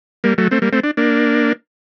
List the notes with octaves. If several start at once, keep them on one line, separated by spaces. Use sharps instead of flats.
G3 A#3
F#3 A3
A3 C4
G3 A#3
A3 C4
D4
A#3 D4